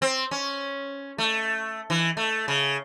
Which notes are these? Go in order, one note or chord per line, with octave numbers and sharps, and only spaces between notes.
C4
C#4
A3
E3
A3
C#3